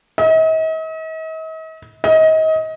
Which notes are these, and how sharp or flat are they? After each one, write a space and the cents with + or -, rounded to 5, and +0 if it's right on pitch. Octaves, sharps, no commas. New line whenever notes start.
D#5 +45
D#5 +30